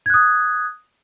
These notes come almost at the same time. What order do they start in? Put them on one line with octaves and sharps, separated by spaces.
G#6 F#6 D#6